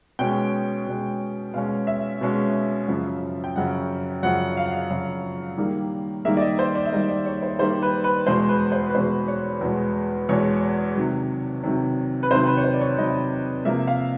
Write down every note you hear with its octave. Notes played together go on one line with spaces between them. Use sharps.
B2 G#3 C#4 G5
B2 G#3 C#4
B2 G#3 C#4 F5
E5
B2 G#3 C#4
F#2 C#3 F3
G5
F#2 C#3 F3 F#5
F#2 C#3 F3 F#5
F5
F#5
F5
F#2 C#3 F3 F5
D#3 G3 A#3
D#3 G3 A#3 E5
D5
D#5
C5
D5
E5
D#3 G3 A#3 D#5
D5
C#5
C5
D#3 G3 A#3 C5
B4
B4
E2 B2 G#3 C5
B4
C5
B4
E2 B2 G#3 C5
C#5
E2 B2 G#3
E2 B2 G#3 C#5
C3 D#3 F#3
C3 D#3 F#3
B4
C3 D#3 F#3 C5
B4
C#5
C5
D5
C#5
C3 D#3 F#3 D#5
C3 F3 A#3 E5
F5